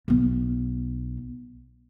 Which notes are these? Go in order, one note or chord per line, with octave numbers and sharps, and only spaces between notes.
B1 B3